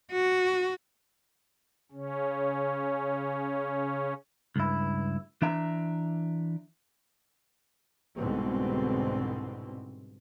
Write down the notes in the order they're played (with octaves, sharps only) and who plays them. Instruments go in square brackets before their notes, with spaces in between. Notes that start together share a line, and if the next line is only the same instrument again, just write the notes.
[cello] F#4
[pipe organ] C#3 C#4
[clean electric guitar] C#2 G2 E4
E3 D4 E5 A#5
[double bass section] C2 G#2 B2 D3 C4